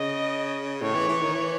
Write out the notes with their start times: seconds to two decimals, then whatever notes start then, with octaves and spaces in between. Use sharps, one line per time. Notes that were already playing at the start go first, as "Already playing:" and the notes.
Already playing: C#3 D#5
0.82 A2 C#5
0.95 E3
1.08 E3
1.22 D#3
1.35 E3